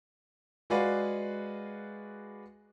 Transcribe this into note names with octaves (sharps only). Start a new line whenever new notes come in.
G#3 F#4 G#4 B4 D5 F5